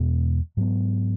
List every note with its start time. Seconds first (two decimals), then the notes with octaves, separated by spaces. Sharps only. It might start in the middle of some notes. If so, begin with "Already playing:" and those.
Already playing: E2 B2 G#3 B3
0.57 G#2 F#3 B3